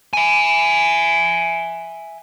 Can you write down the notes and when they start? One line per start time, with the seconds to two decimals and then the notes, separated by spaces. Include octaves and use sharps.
0.13 E5 G#5